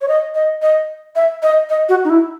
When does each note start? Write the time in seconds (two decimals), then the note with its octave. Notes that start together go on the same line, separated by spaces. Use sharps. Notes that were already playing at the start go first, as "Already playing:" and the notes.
0.01 C#5
0.08 D#5
0.35 D#5
0.62 D#5
1.16 E5
1.43 D#5
1.69 D#5
1.89 F#4
2.05 D#4
2.10 E4